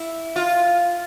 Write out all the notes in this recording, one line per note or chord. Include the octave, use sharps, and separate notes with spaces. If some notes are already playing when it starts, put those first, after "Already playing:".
Already playing: E4
F4